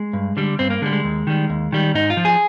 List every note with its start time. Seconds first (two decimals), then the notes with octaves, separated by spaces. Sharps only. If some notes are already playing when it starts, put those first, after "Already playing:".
Already playing: G#3
0.13 G2
0.37 D3 G3
0.59 G2 C4
0.70 A#3
0.82 D3 G#3
0.86 G3
0.93 G#3
1.04 D#2
1.27 D#3 G3
1.49 D#2
1.72 D#3 G3
1.94 G#2 D#4
2.10 F4
2.17 F3
2.25 G#4